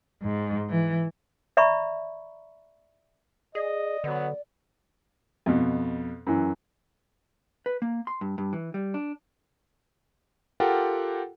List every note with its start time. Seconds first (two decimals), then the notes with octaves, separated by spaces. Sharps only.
0.23 G#2
0.70 E3
1.57 D5 E5 A#5 B5 C#6
3.55 G#4 D5 D#5
4.04 D3 F#3 B3
5.46 F2 B2
6.27 F#2 E3
7.66 B4
7.82 A#3
8.07 C6
8.21 G2
8.38 G2
8.53 E3
8.74 G3
8.94 D4
10.60 F4 G4 A4 A#4 F#5 G5